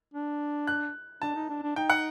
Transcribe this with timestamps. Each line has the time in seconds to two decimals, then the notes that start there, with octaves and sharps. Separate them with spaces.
0.14 D4
0.67 F#6
1.22 D4 A5
1.35 D#4
1.49 D4
1.63 D4
1.76 D#4 G5
1.90 F#5